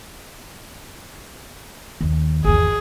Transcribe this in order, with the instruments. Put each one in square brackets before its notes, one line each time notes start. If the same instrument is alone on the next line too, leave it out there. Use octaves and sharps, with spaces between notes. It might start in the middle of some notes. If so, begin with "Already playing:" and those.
[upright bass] D#2
[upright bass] G#1 E2 [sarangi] G#4